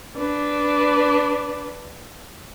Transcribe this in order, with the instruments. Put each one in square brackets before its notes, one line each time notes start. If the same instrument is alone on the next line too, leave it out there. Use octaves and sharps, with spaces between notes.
[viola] D4 B4